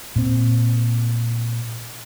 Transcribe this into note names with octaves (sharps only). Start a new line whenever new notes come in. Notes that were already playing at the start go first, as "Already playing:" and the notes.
A#2 C4